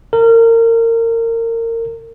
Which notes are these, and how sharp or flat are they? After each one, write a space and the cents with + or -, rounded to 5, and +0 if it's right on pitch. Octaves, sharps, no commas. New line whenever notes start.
A#4 -30